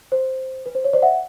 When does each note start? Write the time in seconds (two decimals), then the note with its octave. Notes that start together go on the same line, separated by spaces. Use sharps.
0.12 C5
0.66 B4
0.75 C5
0.84 C#5
0.93 C5 D5
1.02 E5 F#5